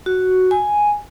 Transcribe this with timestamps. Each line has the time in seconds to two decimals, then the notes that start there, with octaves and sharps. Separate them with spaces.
0.06 F#4
0.51 G#5